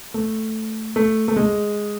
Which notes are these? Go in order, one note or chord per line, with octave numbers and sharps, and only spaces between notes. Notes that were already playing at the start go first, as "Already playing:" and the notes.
A3
A3
A3
G#3